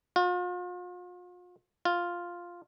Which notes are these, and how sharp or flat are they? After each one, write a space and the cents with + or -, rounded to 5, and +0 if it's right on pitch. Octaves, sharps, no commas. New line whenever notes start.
F4 +40
F4 +0